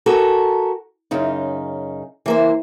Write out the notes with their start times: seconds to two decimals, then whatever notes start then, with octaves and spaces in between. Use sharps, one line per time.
0.06 F#4 G4 A4 A#4 G#5
1.11 F#2 C#3 D#4
2.26 E3 A#3 C5